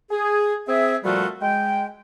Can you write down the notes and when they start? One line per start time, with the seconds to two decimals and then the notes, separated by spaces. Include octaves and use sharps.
0.10 G#4
0.67 C4 G#4 E5
1.04 A#2 F3 G3 A3 F4 F#4
1.41 G#3 G5